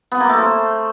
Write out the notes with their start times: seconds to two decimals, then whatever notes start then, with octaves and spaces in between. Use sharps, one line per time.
0.12 B3
0.20 A#3
0.29 A3
0.38 C5